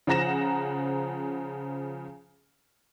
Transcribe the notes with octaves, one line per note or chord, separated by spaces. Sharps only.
C#3 F3 F#5 A#5 A#6 E7